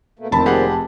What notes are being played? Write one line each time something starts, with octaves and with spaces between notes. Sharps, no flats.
B2 A3 A#3
F1 A#2 D#3 C4 A5 B5
G4 G#4 F#5